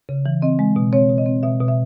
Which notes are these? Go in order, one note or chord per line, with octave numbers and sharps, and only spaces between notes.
C#3
E3
C4 D#5
G#3
B2
C4 C#5
B2
D#5
C4
B2 E5
B2
E5